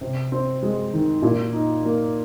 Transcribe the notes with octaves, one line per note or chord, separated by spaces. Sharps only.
C3
C4
G#3
D#3
A#2
D#4
A#3